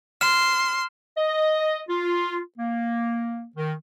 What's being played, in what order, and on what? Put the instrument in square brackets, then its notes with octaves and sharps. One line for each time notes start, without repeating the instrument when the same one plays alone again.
[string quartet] C6 [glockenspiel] F6 E7
[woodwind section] D#5
F4
A#3
D#3